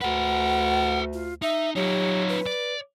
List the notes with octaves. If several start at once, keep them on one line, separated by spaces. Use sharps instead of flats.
D2 A4 B4 F#5
F4
D#4 E5
F#3 D#4 F4 G4
B4
D5